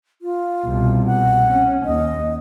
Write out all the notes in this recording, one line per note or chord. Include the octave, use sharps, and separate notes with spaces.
F4
C2 B2
F#5
C#4
D#2 D#5